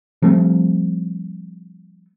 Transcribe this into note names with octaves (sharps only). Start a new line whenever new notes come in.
F3 G3 A3 C4